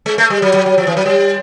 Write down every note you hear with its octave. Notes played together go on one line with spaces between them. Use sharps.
G#3
A3
G3
F#3
F#3
F#3
F3
E3
F#3
G3